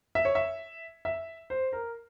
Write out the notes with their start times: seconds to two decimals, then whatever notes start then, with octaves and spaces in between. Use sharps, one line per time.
0.15 E5
0.25 C#5
0.35 E5
1.05 E5
1.50 C5
1.73 A#4